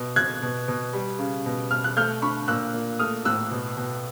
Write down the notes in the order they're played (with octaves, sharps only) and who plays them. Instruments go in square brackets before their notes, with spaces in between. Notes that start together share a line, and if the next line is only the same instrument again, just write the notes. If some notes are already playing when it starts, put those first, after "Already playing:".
Already playing: [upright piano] B2
B2 F#6 G#6
B2
B2
G3
C#3
B2
B2 F6
F#6
A3 F6 G6
D3 B5 C#6
A#2 E6 F#6
A#2
A3 D#6 F6
A2 E6 F#6
B2
B2